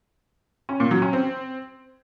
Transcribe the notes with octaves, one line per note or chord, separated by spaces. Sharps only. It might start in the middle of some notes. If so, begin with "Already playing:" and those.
C#4
A#2
F#3
C#4
C4